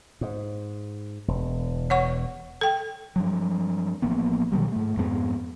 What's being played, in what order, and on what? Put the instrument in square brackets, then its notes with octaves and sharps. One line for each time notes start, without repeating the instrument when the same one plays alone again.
[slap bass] G#2
E1
[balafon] C#5 F#5 C#6
A4 G5
[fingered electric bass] G2 F3 F#3
A1 F3 A#3 B3
B2 D#3 F#3 G3
G#2 A3
F2 G#2 G#3 B3